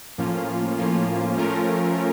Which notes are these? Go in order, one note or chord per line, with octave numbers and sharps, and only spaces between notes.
A2 F3 A#3 C#4 F4
A2 F3 A#3 C#4 F4
F3 A3 C#4 F4 A#4
F3